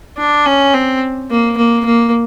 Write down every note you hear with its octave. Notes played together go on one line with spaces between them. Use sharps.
D4
C#4
C4
A#3
A#3
A#3